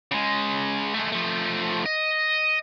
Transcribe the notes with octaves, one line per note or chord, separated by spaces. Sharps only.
C#3 G#3
G#3 A3
F3 A3
D#5